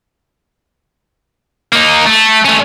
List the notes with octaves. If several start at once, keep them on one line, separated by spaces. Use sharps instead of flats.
A#3 D#4
A3
A3 C#4